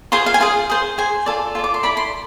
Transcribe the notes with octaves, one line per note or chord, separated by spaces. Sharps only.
F4 G#4 C5 C6
F5
G#5
F4 G#4 C5 F5
G#4 C5
G#4 C5 G#5
F4 A4 D5
F4 A4 D5
D6
C6
E4 A4 D5 B5
C6